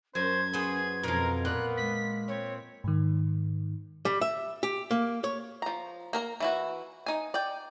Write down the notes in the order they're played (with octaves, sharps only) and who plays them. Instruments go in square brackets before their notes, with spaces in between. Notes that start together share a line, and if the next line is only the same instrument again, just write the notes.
[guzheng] F#2 [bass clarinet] C#4 [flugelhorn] C5 [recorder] G#6
[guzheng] B3 C5 [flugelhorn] G#4
[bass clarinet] F2 [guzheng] B2 F3 [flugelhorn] A#4
[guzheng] A#2 [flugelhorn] B3 [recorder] F#6
[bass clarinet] G#3 [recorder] B6
[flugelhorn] C4 [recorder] C#5
[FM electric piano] G#2 D#3
[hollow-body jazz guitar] G3
E5
G4
A#3
C#5
[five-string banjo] F3 A#5
A#3 A#4 A#5
E3 E4 F#4
D#4 G#5
D5 G5